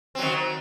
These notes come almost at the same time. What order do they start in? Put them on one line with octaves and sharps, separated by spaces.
C4 F#3 D#3